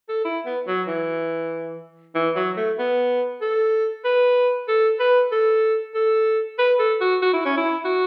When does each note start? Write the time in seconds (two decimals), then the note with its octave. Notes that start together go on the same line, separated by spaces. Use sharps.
0.09 A4
0.25 E4
0.45 B3
0.67 F#3
0.87 E3
2.15 E3
2.36 F#3
2.57 A3
2.79 B3
3.41 A4
4.05 B4
4.68 A4
5.00 B4
5.32 A4
5.95 A4
6.59 B4
6.79 A4
7.01 F#4
7.22 F#4
7.33 E4
7.45 C#4
7.57 E4
7.85 F#4